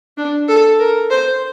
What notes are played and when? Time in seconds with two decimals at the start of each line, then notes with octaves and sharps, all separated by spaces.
0.17 D4
0.49 A4
0.80 A#4
1.10 C5